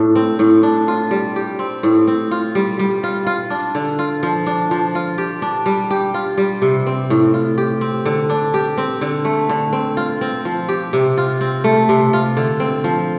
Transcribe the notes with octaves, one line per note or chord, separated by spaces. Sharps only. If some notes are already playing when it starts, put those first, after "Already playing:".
Already playing: A2 D4
C4
A2
D4
F4
G3
G4
C4
A2
C4
F4
G3
G3
F4
F4
D4
D3
F4
F3
D4
F3
F4
G4
D4
G3
G4
F4
G3
C3
C4
A2
F4
G4
C4
D3
D4
G4
C4
D3
A3
D3
C4
F4
C4
F3
G4
C3
F4
C4
A3
C3
F4
D3
C4
F3